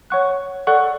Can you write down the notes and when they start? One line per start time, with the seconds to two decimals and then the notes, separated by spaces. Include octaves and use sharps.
0.10 C#5 F#5 C#6 F#6
0.67 A4 D5 F#5 C#6 F#6